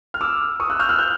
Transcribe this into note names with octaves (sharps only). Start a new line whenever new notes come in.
F6
D6 E6
C#6 D#6
E6 F#6
F6 G6
E6 F#6
F6 G6